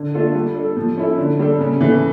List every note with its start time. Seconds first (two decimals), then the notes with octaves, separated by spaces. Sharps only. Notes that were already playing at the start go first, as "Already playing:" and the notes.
Already playing: D3
0.14 A3 D4 F4 A4
0.35 G3
0.56 D4 A4
0.77 F3
0.97 C#4 E4 A4
1.18 D3
1.39 G3 D4 A4
1.60 C#3
1.81 E3 A3